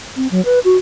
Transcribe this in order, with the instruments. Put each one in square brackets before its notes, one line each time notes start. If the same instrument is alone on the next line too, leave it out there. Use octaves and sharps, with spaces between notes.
[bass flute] C4
F#3
B4
F#4